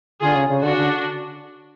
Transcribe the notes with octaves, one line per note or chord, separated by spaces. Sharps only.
D3 F4 G#4
C#3
C#3
D3 D4 F#4
D3